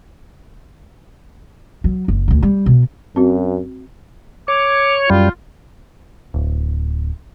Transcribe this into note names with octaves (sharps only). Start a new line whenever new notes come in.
F#3
F#1
D2 A#2
G3
B2
F#2 C4 F#4
C#5 D6
F#2 G3 F4
D1